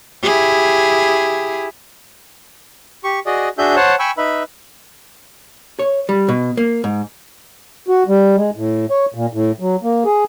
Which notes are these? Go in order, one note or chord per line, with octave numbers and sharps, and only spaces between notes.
E4 G4 G#4
G4 C#6
F#4 G#4 D5 D#5
D4 F#4 G#4 E5 G6
C5 C#5 F#5 A5
G5 G#5 B5 C#6 E6
D#4 B4 E5 B5
C#5
G3
B2
A#3
G#2
F#4
G3
G#3
A2
C#5
A#2
A2
F#3
A#3
G#4